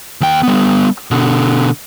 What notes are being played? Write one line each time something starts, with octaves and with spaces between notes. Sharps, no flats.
D#2 G5
G3 B3
B2 D3